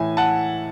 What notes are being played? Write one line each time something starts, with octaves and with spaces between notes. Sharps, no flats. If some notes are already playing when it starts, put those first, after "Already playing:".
Already playing: A2 E3 E5 G#5
F#5 A5